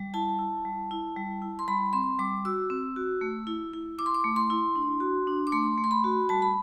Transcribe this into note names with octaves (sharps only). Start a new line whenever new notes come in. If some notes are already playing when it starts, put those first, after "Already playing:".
Already playing: G3
E4 A5
E4
G3
E4
G3
E4
C6
G3 B5
C4 C6
G3 D6
F#4 E6
C4
F#4
A3
E4
E4
E4 D6
C6
D6
A3
C6
E4
D4
F#4
D4
D6
A3 C6
A3
C6
B5
F#4
G3 A5
B5